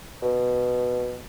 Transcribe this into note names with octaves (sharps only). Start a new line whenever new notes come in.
B2